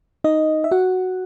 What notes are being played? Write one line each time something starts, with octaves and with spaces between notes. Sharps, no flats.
D#4 D#5
E5
F#4 F#5